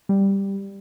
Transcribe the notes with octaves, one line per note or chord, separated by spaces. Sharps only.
G3